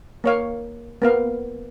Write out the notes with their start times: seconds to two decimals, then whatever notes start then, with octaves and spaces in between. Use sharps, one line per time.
0.24 A#3 C#5 F5
1.02 A#3 B3 F5